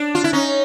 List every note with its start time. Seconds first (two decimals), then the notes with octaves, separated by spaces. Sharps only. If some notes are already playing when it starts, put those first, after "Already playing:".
Already playing: D4
0.15 F4
0.24 E4
0.33 C#4 D#4